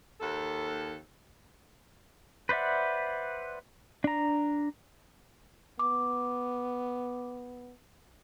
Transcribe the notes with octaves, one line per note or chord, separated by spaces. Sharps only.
D#2 A4
B4 C5 D5 E5 F#5
D4 A#5
B3 D6